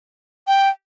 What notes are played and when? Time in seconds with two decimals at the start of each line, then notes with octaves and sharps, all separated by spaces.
0.47 G5